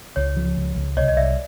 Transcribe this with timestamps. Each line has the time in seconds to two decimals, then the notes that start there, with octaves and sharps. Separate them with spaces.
0.16 C#2 C#5
0.36 F3
0.57 C#2
0.76 C#2
0.97 C2 C#5 D#5
1.08 D#5
1.17 C2 D5 E5